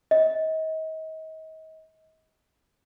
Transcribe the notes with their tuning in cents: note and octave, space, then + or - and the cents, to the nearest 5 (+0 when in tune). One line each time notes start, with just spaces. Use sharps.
D#5 +35